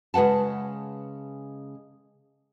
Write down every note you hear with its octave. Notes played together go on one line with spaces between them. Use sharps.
C#3 G#3 B4 F#5 A5